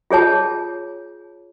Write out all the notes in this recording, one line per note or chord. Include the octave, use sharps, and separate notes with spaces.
F4 G#4 C#5 A5